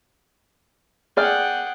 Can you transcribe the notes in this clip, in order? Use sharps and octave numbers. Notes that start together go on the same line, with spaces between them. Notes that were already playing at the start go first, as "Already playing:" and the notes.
G#4 D5 F#5 G5 F6